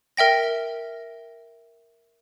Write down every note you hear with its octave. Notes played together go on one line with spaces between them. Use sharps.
A#4 E5 G5 A#6